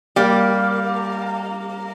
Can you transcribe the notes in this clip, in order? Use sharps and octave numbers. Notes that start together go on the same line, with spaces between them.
G3 A#3